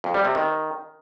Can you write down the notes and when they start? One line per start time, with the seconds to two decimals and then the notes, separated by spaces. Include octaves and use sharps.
0.04 F2
0.14 G3
0.25 C3
0.35 D#3